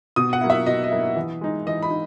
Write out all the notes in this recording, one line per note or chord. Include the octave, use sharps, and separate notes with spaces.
B2 D#6
F#5
F#3 A#3 E4
E5
B2 D#5
D#5
F#3 A#3 E4
E3
G#3 D#4
E3 D#5
B5
D#4